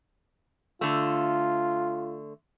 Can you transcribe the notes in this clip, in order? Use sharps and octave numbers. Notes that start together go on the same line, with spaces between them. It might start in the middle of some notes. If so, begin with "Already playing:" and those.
D3 A3 F4